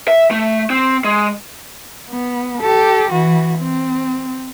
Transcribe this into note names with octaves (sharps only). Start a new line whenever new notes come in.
E5
A3
C4
G#3
B3
G4 A4
E3 F#4
C4